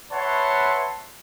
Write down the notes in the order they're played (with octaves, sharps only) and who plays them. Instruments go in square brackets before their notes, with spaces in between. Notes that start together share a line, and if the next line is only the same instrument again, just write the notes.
[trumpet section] B4 C#5 E5 F#5 A5 C6